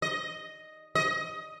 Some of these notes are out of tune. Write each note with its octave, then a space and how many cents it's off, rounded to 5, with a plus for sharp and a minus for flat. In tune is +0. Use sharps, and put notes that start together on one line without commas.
D#5 +0
D#5 +10